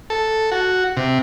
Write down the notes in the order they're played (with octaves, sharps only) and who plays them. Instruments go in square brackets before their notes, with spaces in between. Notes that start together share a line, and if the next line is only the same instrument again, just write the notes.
[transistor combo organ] A4
F#4
C3